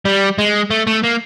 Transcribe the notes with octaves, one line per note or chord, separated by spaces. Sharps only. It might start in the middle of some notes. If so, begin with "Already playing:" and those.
G3
G#3
A3
A3
A#3